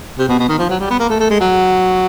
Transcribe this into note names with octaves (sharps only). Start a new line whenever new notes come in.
C3
B2
B2
D#3
F3
F#3
G3
B3
A#3
A3
A3
G#3
F#3